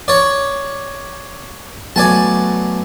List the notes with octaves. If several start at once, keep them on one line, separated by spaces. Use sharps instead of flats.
C#5 D5
F#3 A3 B3 D5 G#5 A5